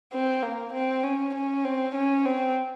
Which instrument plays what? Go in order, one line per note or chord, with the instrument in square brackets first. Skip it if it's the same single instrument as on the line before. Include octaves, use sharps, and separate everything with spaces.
[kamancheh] C4
A#3
C4
C#4
C#4
C4
C#4
C4